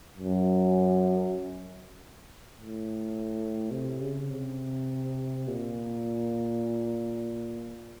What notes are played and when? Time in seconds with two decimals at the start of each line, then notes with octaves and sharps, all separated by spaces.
0.17 F#2
2.54 A2
3.71 C3
4.01 C#3
4.30 C3
5.48 A#2